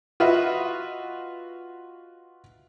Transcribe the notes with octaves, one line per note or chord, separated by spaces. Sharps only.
F4 F#4 B4 D#5 E5